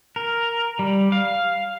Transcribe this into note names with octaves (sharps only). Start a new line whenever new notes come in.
A#4
G3
F5